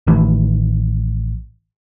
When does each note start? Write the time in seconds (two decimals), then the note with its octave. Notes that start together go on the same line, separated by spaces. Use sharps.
0.07 A1 D#3 E3